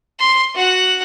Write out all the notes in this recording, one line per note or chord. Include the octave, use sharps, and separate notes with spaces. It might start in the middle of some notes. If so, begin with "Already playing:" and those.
C6
F#4 F#5